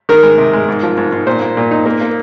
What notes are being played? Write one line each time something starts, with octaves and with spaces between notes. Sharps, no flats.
D#3 A#4
G#3
C3
G#3
G#2
F3
G#2
G#2
A#2 C5
A#2
A#2
D#4
A#3
A#3